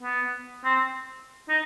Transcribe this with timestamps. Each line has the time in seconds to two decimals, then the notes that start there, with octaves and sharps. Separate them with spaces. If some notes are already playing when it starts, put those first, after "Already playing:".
0.02 B3
0.64 C4
1.49 D#4